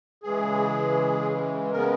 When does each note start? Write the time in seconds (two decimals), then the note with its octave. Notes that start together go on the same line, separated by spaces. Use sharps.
0.23 C#3 E3 G#3 G#4
1.71 C#3 G#3 B3 A#4